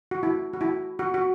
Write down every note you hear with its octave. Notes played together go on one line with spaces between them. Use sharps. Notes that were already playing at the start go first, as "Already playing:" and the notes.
F#4
E4
F#4
E4
F#4
F#4